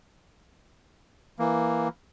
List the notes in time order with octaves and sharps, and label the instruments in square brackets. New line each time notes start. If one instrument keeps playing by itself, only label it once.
[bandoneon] E3 A#3